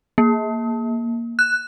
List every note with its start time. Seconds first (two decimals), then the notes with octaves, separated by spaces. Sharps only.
0.18 A#3
1.39 F#6